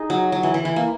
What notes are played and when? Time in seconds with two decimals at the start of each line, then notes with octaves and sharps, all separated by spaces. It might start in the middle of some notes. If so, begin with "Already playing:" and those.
Already playing: D#4 G#4
0.10 F#3
0.32 F#3
0.43 E3
0.54 E3
0.65 E3
0.76 A#3